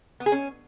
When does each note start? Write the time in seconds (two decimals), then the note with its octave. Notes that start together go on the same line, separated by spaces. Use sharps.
0.20 B3
0.26 G#4
0.32 C#4